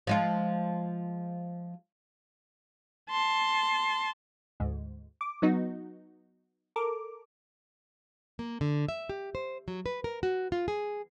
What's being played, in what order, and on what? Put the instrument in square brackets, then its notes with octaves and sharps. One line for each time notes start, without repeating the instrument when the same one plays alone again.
[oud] F3 G#3 F4
[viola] A5 C6
[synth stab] D2 G#2
D6
F#3 B3 D#4 F#4
A4 A#4 D6
[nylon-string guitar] A#3
D3
E5
G4
C5
F#3
B4
A#4
F#4
F4
G#4